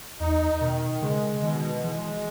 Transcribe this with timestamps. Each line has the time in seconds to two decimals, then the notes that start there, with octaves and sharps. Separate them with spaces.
0.20 E2 D#4
0.60 B2 D#3
1.02 C#3 G#3
1.42 B2 D#3
1.83 E3 G#3